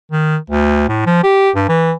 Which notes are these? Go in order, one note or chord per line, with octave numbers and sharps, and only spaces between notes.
D#3
D2
A2
F3
G4
G2
E3